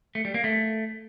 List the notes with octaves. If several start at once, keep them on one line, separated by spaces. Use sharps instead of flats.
A3
G3
A#3
A3